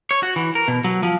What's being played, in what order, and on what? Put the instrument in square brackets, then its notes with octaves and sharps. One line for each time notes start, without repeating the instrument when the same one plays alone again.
[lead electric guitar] C#5
F#4
E3
A#4
B2
F#3
F3